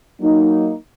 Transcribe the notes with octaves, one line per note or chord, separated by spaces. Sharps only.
F#3 A#3 D#4